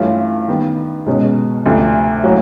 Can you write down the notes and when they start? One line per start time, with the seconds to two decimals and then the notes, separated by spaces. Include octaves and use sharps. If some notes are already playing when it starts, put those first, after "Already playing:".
Already playing: G2 E3 A3 C#4 F4
0.48 D#3 G3 B3
1.06 C#2 B2 G#3 C#4
1.65 D2 C3 F3 A3 D4
2.23 A2 F#3 A#3 C#4 F#4